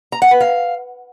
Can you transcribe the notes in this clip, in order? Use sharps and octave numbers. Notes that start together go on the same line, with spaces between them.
A#5
F#5
B4
F5